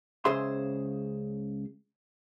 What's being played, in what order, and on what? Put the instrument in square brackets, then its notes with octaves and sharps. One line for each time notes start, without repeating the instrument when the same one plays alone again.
[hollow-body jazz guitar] C#2 C#3 G#4 C5 E5 C6